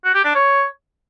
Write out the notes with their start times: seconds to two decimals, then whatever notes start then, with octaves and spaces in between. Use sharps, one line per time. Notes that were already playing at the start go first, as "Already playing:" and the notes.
0.04 F#4
0.14 G4
0.25 D4
0.35 C#5